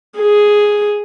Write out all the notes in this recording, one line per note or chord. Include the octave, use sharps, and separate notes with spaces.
G#4